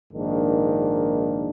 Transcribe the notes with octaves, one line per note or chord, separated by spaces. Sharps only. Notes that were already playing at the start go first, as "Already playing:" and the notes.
A#1 G#2 D#3 A#3 D4